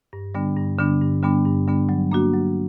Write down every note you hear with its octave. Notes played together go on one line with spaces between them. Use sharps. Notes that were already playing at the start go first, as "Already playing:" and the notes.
G2
D3 G3 B3 D4
G2
D3 G3 B3 D4
G2
D3 G3 B3 D4
G2
D3 G3 B3 D4
F#3
A#3 D4 F#4
F#3